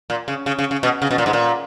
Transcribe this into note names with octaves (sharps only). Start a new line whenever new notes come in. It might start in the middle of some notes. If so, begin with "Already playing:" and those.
A#2
C#3
C#3
C#3
C#3
B2
C#3
B2
A#2
G#2
A#2